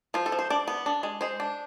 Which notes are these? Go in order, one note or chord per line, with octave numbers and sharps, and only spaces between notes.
F3 F4
A4
F3
C5
D4 D5
B3
D4
G#3
G#3 C5
D4